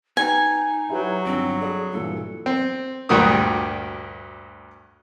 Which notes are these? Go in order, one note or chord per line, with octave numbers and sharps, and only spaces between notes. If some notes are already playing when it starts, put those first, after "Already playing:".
D#4 B4 G5 G#5
F#3 E4 G4 B4
G1 C4 D4
G#4 A4 D5 B5
G2 A#2 E3 A4
C4
D2 G2 A#2 F#4 A#4 D#6